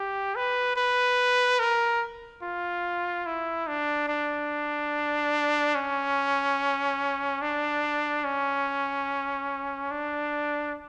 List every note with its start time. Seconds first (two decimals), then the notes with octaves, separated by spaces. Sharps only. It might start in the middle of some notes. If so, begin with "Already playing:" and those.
Already playing: G4
0.36 B4
0.77 B4
1.59 A#4
2.43 F4
3.26 E4
3.67 D4
4.09 D4
5.75 C#4
7.42 D4
8.24 C#4
9.91 D4